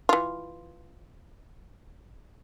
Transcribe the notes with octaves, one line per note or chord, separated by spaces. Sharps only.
E3 F4